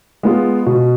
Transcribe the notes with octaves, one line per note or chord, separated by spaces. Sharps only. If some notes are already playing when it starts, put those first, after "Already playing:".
G#3 B3 F4
B2